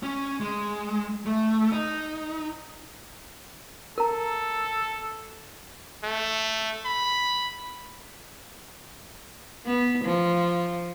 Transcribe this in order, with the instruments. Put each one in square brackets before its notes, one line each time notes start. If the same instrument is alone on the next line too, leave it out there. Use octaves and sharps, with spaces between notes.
[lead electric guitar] C#4
G#3
A3
D#4
[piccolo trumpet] A4 [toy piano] A#4 A#5
[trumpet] A3
B5
[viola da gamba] B3
F3